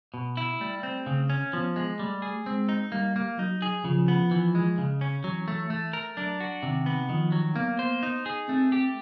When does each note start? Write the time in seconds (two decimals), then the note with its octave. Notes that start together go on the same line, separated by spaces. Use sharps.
0.14 B2
0.37 E4
0.60 G3 A3
0.83 C4
1.06 C#3
1.30 C#4
1.53 F3 B3
1.76 G#3
1.99 G3 A3
2.22 G#4
2.46 G#3 C4
2.69 D#4
2.92 G3 A#3
3.16 A#3
3.38 F#3 D#4
3.62 G#4
3.84 C#3 F3
4.08 B3
4.31 E3
4.55 G#3
4.78 C#3
5.01 C#4
5.24 E3 F#3
5.48 A3
5.70 A3
5.93 A#4
6.16 F#3 D4
6.40 F#4
6.63 C3 D#3
6.86 B3
7.09 D#3 F3
7.32 F#3
7.55 A#3 B3
7.79 C5
8.03 D#4
8.26 G#4
8.49 A3 C4
8.72 G4